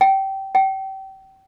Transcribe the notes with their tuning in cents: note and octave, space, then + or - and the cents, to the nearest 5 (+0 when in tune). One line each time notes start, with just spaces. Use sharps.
G5 -20
G5 -30